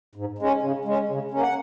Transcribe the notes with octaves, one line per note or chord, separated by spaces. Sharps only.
G#2
G#3 C#4
C#3
G#3 C#4
C#3
A#3 C#4
F#5